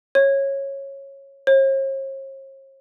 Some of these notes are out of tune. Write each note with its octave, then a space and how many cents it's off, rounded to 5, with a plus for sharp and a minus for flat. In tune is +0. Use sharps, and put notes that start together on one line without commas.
C#5 -15
C#5 -45